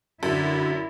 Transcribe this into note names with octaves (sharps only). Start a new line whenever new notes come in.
F#2 D3 E4